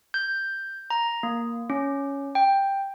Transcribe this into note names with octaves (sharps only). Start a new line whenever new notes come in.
G6
A#5
A#3
C#4
G5